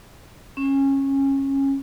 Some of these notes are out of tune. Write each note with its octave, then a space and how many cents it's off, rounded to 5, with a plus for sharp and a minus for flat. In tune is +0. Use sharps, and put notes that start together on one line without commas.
C#4 -20